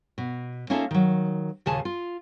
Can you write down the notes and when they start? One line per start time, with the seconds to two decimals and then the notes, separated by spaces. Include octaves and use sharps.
0.18 B2
0.70 A#3 C#4 D#4 F4 A4 E5
0.91 D#3 F#3
1.66 D#2 A#2 C#3 G#4 G#5 A5
1.85 F4